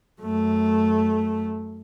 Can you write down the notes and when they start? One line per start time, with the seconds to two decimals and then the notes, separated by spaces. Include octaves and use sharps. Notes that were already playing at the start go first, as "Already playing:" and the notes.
0.21 F#2 A3